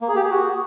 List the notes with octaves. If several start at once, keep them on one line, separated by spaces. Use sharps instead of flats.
A#3
G#4
G4
G#4
F#4